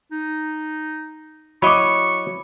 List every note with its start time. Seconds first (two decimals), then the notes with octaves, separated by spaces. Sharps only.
0.11 D#4
1.62 F#3 E4 D#5 B5 C#6 D6